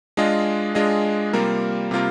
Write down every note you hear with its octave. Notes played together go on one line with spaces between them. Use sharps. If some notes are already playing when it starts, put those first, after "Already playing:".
G#3 D4 F4 G#4 D#5
G#3 D4 F4 G#4 D#5
C3 G3 A#3 F4 A#4
C3 G3 A#3 F4 A#4